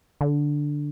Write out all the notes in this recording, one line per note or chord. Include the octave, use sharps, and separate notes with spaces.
D3